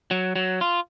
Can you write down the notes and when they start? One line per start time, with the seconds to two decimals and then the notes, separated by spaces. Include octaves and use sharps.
0.11 F#3
0.36 F#3
0.61 F4